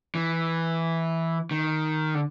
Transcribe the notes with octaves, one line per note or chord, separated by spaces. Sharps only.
E3
D#3
D3